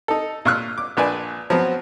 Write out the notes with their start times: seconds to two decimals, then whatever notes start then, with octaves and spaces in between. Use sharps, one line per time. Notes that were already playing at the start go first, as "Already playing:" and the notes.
0.08 D#4 A4
0.45 A#2 F4 C#6 E6 F#6
0.78 D6
0.97 A#1 D4 B4 D5 G#5
1.50 F3 F#3 B3 C4